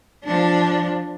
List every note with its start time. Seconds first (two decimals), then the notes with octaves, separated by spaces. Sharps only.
0.24 F3 D4